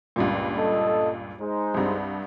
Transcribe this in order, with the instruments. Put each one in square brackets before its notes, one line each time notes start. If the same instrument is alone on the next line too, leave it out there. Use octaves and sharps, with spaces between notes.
[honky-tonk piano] C#2 G2 A#2
[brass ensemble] A4 D#5
G#3 D#4 C5
[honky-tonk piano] C2 G2